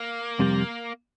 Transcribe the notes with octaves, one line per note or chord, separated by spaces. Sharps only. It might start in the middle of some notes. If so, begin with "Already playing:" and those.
Already playing: A#3
F2 C3 G3